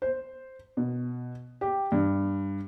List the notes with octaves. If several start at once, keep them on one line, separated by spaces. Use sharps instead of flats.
C5
B2
G4
G2